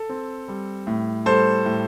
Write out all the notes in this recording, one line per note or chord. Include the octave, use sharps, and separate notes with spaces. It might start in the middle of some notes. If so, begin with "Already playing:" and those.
Already playing: A4
C4
G3
A2
G3 A4 C5
A2